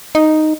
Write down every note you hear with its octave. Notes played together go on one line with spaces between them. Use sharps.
D#4